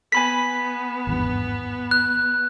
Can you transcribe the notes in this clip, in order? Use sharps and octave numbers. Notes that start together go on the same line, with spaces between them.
B3 G#5 B5 B6
G#1 E2 G2
F#6